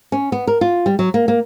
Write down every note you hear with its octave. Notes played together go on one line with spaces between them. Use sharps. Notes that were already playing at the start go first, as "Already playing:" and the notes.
C#4
B3
A#4
F4
G3
F#3
A#3
A#3